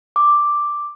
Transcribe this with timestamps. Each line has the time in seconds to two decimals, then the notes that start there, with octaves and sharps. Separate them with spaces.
0.16 D6